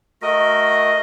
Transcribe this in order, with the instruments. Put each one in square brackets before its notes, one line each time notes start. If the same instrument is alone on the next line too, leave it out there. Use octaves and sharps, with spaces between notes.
[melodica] A3 F#4 A#4 [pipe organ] D#5